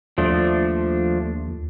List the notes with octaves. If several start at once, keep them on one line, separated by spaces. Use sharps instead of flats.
D#2 F3 A3 D4